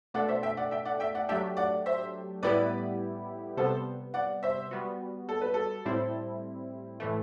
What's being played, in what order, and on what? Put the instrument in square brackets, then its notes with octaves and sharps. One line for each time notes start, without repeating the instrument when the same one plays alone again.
[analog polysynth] B2 A3 D4 A4 [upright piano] D5 F#5
[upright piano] C5 E5
E5 G5
D5 F#5
E5 G5
D5 F#5
E5 G5
D5 F#5
[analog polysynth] F#3 A3 D4 G4 [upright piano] E5 G5
[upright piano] D5 F#5
C5 E5
[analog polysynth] A2 G3 B3 E4 G4 [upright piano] B4 D5
[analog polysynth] C3 G3 B3 [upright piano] A4 C5
[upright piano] D5 F#5
C5 E5
[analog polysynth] G3 B3 F#4
[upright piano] A4
B4
A4
[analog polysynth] A2 G3 C4 E4
A2 E3 A3